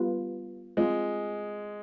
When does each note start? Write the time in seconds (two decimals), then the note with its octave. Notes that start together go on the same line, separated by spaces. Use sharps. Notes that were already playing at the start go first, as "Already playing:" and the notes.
Already playing: G3 B3 F4 B4
0.77 G#3 C4 F4 C5